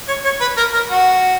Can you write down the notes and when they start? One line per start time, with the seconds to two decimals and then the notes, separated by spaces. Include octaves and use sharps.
0.08 C#5
0.25 C#5
0.41 B4
0.57 A#4
0.74 A#4
0.90 F#4